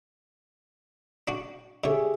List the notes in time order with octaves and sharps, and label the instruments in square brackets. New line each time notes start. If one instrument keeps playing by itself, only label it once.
[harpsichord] D4 F#4
[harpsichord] D3 C#5 [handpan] G4 G#4 E5